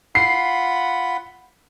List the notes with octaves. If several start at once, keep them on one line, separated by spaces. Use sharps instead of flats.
F4 F#5 B5 C7